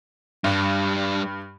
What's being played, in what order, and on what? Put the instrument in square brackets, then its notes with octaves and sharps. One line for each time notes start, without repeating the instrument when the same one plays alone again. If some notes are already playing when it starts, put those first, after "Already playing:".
[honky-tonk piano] G2 [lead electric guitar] G3 D4